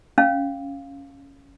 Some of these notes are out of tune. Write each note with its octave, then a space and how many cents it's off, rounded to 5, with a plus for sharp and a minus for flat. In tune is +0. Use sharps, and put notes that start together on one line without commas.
C#4 +0 F5 +0